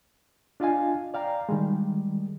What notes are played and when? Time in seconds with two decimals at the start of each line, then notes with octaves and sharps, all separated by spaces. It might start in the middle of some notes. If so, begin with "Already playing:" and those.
0.60 D4 F4 D#5 F5 G#5
1.14 D5 F5 G5 A#5
1.49 D#3 G3 G#3